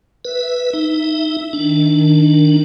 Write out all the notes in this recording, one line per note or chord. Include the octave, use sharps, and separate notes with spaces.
B4 E5
D#4
D#3 D4